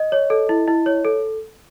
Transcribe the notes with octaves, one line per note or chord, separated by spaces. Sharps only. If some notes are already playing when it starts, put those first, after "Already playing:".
Already playing: D#5
C#5
A4
E4
E4
C#5
A4